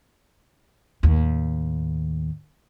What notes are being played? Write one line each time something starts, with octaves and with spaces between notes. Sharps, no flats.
D#2 A2